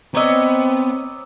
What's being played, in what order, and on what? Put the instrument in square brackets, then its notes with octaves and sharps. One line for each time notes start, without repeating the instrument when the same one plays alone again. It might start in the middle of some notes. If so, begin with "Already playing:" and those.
[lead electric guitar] B3 [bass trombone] C4 [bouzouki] C#5 D#5 [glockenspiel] A#5 D6 E6